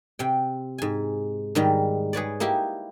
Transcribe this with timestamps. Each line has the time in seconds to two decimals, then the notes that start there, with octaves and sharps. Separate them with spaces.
0.19 C3 G5
0.78 G#2 G#5
1.55 G#2 D#3 G3
2.13 G#4 B4 C#5 D5
2.40 A#3 D#4 E4 G4